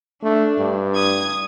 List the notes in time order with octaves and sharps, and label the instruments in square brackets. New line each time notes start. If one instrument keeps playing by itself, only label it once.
[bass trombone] A3 [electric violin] D4
[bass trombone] G2
[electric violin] D#6 G#6